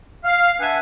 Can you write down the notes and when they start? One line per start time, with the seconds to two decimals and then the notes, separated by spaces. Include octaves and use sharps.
0.25 F5
0.60 D4 B4 E5 F#5 G#5